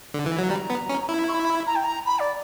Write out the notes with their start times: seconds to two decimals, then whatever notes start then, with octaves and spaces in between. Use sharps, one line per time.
0.14 D3
0.26 E3
0.38 F#3
0.50 G3 A#5
0.70 B3
0.89 C#4
1.09 E4
1.28 C#6
1.32 B5
1.67 A#5
1.75 G5
1.84 A#5
2.06 B5
2.19 D5